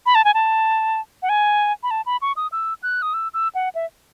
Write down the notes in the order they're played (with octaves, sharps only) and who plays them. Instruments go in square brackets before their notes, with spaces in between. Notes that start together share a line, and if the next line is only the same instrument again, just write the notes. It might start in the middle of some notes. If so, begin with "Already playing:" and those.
[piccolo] B5
A5
G#5
A5
F#5
G#5
B5
A5
B5
C#6
D#6
E6
F#6
D#6
E6
E6
F#5
E5